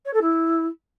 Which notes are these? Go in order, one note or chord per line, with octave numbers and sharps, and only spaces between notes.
C#5
A4
E4